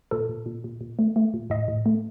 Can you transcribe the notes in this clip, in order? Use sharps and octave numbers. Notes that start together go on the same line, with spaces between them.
A#2 A4
A#2
A#2
A#2
A#2
A3
A3
A#2
A2 D#5
A2
A3